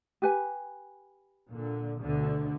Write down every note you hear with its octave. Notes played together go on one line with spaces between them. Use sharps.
G4 B4 G#5
A#2 D3
D2 B2 D3